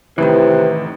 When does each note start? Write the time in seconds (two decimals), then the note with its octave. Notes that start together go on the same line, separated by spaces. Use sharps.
0.18 A1 A2 C3 D#3 E3 B4